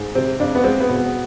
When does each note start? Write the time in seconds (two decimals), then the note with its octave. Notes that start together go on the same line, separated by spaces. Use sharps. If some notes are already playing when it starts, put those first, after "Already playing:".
Already playing: G#2
0.15 C3 C4
0.40 F2 D4
0.55 B3
0.64 G#3 C4
0.80 B3
0.89 B2
0.96 B3